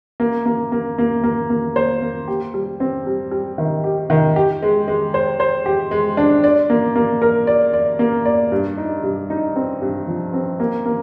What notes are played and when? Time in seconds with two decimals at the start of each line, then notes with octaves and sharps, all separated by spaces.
0.20 A#3
0.46 A#3
0.72 A#3
0.98 A#3
1.24 A#3
1.50 A#3
1.76 C5
2.02 A#3
2.28 G4
2.54 G3
2.80 C4
3.06 G3
3.31 G3
3.58 D#3
3.84 G4
4.10 D#3
4.36 G4
4.62 G#3
4.88 G#3
5.14 C5
5.40 C5
5.66 G4
5.91 G#3
6.17 D4
6.44 D5
6.70 A#3
6.96 A#3
7.22 A#4
7.47 D5
7.73 D5
7.99 A#3
8.25 D5
8.52 G2
8.77 D#4
9.03 G2
9.30 D#4
9.56 C4
9.82 G2
10.08 F3
10.33 C4
10.60 A#3
10.86 A#3